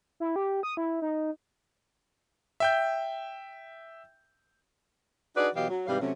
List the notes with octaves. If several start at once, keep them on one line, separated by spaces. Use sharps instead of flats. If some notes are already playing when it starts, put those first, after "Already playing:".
E4
G4
D#6
E4
D#4
E5 G5 G6
D4 D#4 F#4 G#4 B4 D5
B2 E3 F#3 G4 D#5 F5
F#3
G#2 C3 E3 G3 B4 F5
C3 F#3 A3 C#4